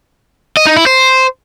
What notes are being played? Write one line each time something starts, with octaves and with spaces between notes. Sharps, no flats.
D#5
D#4
E4
C5